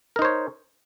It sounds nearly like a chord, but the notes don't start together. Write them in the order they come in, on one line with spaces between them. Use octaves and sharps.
A#4 D#4 C5 C#5